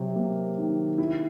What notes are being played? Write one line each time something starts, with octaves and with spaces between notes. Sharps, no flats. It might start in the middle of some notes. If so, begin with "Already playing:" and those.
Already playing: C3 F#3
A#3
D#3
E4